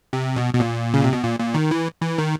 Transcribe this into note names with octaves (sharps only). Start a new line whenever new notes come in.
C3
B2
B2
A#2
C#3
C3
B2
A#2
A#2
D#3
E3
E3
D#3